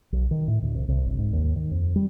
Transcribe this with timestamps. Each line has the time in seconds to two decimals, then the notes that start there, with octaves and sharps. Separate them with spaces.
0.12 B1
0.31 D#3
0.48 A2
0.63 D2
0.74 C2
0.88 C2
1.05 G1
1.18 G#2
1.33 D#2
1.56 D#3
1.71 F2
1.96 G3